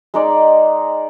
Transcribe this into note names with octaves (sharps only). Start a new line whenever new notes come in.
G#3 D#4 D5